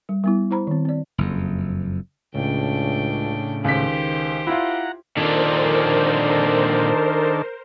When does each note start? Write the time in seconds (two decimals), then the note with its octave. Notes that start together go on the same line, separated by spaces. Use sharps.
0.09 G3
0.24 G3 B3 E4
0.51 E4 C5 A#5 B5
0.67 D#3 C4
0.85 C4 D5
1.18 F#1 F2
2.35 C#2 A2 C#3 D4 G5
3.64 C#2 D#3 G4 C5 B6
4.47 E4 F4 F#5 A#5
5.17 A#2 D3 D#3 D4 A4 A#4 C5